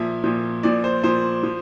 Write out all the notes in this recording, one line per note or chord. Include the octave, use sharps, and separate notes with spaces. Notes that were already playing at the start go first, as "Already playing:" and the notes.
Already playing: A#2 F3 E5
A#2 F3
A#2 F3 D5
C5
A#2 F3 C5
F3